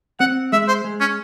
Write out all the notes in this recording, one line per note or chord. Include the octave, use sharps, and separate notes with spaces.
C4 F#5
G#3 E5
C5
G#3
C#4